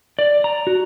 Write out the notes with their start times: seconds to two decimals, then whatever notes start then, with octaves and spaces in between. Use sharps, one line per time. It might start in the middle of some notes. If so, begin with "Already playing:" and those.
0.19 D5
0.44 A#5
0.67 F#4